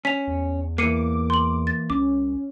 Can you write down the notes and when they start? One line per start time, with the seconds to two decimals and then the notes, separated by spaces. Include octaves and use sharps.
0.05 C#4 B6 F7
0.27 E2
0.78 E3 A#3 D6 C7 C#7 D#7
1.30 C6 F#7
1.67 A6
1.90 C2 C#4 D6